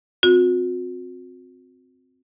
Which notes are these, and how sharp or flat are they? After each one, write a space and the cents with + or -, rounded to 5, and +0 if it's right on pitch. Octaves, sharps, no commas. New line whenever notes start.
C4 -5 F#4 -40